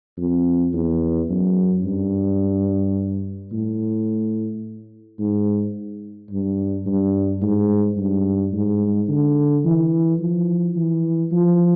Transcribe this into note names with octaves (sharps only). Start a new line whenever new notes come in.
F2
E2
F#2
G2
A2
G#2
G2
G2
G#2
G2
G#2
D3
E3
F3
E3
F3